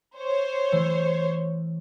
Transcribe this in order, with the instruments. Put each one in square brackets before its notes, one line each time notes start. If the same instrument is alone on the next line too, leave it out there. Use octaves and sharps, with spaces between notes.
[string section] C5 C#5
[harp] E3 A3